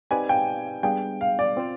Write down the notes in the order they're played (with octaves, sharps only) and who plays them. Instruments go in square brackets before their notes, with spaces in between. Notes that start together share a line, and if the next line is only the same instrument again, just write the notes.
[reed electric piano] C4 D#4 G4 B4 D5 [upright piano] G#5
[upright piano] G5
[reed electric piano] G3 B3 D4 G#4 [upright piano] G5
[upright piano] F5
D5
[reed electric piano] C4 F4 C5